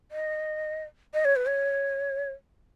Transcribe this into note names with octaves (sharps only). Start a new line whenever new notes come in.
D#5
D#5
C#5
B4
C#5